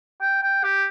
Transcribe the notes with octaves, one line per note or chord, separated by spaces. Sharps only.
G5
G5
G4